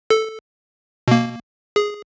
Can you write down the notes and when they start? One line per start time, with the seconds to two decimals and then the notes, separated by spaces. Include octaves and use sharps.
0.10 A4
1.08 B2 A#3
1.76 G#4